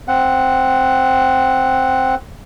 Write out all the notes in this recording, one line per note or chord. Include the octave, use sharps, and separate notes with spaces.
C4 F#5